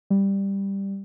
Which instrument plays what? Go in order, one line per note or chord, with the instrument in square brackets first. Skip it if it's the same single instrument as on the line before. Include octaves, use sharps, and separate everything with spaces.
[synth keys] G3